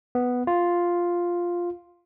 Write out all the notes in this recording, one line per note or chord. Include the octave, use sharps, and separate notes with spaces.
B3
F4